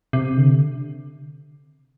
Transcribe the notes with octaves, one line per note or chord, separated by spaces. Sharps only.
C3
D3